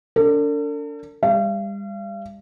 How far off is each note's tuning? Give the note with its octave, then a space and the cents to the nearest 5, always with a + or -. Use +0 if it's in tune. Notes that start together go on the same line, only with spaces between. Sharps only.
D4 -30 A4 +45
G3 +40 F5 -40